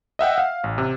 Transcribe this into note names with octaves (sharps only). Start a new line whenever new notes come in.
D#5 E5 F#5 G5
F5
A1
C3